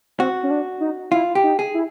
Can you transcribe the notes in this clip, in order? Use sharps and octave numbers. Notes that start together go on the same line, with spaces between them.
C4 F#4
C#4
D4
D#4
E4 F4
G4
D#4
G#4
E4